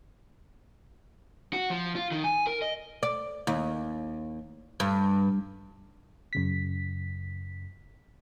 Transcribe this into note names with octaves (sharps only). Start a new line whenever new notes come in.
F#4
F3
F4
D#3
G#5
A#4
D#5
D5
D#2
G2
F#2 C#3 B6